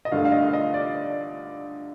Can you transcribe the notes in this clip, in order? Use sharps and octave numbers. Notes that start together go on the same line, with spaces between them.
D#5
G2 D3 A3 F5
F5
D#5
F5
D#5
D5